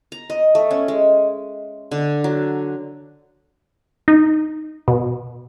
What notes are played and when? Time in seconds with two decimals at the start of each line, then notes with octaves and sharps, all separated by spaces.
0.12 A#5
0.30 D#5
0.55 A3
0.71 C#4
0.88 G#3
1.91 D3
2.24 F#3
4.08 D#4
4.88 B2